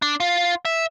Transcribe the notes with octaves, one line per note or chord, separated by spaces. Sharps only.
D4
F4
E5